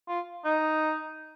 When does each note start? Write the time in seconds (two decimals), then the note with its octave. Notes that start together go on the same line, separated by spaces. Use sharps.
0.08 F4
0.45 D#4